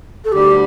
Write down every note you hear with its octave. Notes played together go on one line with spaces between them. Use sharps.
A4
D2 D3 G3 G4